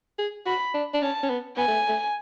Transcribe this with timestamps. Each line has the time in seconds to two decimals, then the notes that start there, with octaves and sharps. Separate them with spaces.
0.19 G#4
0.46 F#4 B5
0.74 D4
0.94 D4
1.02 C#4 A5
1.23 C#4
1.30 B3
1.57 B3 G#5
1.68 A3
1.88 A3